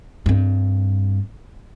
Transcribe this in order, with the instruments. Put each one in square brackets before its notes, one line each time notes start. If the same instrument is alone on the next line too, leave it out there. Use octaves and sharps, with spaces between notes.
[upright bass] G2 C4